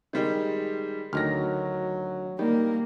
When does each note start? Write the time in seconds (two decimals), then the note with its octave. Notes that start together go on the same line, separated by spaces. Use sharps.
0.13 D#3 G3 G#3
1.13 D2 D#3 F#3 F6 A#6
2.39 D#3 G3 A#3